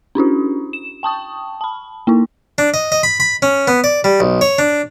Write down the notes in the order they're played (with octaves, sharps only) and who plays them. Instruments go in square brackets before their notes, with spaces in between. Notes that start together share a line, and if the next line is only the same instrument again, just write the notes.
[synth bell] C#4 D4 E4 F#4
E7
G5 A5 C#6 D#6
A5 B5
A#3 D#4 E4
[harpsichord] D4
D#5
D#5
B5
B5
C#4
B3
D5
G3
B1
C#5
D4